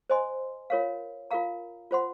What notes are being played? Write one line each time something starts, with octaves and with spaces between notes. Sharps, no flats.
C5 D#5 G#5 C6
F4 A#4 C#5 F5
F4 A#4 F5 A#5
F4 C5 F#5 C6